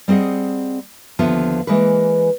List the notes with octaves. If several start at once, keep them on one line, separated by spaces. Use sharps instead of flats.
G3 C4 G#4 D#5 F#5
D#2 D3 F3 B3 F4 E5
E3 F3 G#3 A#3 A#4 B4